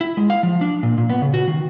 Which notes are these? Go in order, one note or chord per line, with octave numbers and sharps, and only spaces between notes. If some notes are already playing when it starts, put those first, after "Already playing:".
E4
G#3
F5
F3
D4
A#2
A#2
B3
C#3
F#4
D#3